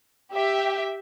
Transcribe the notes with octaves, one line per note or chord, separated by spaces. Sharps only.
G4 E5 G5